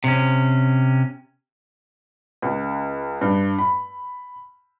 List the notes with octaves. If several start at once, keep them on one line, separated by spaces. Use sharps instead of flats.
C3 C#4
C#2
G2
B5